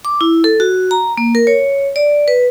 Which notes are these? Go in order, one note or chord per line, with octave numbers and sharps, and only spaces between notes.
D6
E4
A4
F#4
A#5
A#3
A#4
C#5
D5
B4